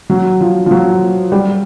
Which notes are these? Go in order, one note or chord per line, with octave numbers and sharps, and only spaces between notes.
F#3
F3
F3
F#3
G3